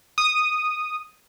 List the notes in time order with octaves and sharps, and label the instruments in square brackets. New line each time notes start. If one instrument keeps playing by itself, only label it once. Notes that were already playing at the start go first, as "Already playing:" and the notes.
[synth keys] D#6